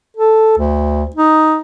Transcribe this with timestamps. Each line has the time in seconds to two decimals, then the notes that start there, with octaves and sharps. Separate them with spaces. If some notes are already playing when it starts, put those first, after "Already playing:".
0.17 A4
0.58 D2
1.16 D#4